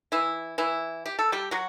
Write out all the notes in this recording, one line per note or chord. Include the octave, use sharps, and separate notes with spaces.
E3 E4
E3 E4
G4
A4
G3 G4
F#3 F#4